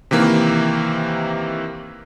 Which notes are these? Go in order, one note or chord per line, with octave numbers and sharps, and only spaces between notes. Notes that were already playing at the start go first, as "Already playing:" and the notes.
C3 D#3 E3 A#3